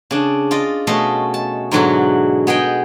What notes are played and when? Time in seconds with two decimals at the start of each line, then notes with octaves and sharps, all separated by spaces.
0.11 C#3 D4
0.51 F4 D5 D#5
0.87 B2 A3 C#4 A4 D#5 C6
1.34 A5
1.71 G#2 B2 D3 F#3 E4 F#4
2.47 B3 G#4 D#5 G5